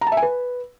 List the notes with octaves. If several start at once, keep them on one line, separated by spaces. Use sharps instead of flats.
A#5
A5
E5
G#5
B4